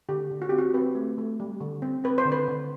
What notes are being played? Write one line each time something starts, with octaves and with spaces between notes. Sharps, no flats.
D3 G4
D3
F#4
C4 G4
F#4
C4 B4
A3
A3
G3
D3
C4
C4 B4
C5
D3
B4
D3